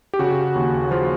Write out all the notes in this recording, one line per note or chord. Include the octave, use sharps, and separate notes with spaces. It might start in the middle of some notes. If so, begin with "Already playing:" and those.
G4
C#3 F#4
D#2
F3 F4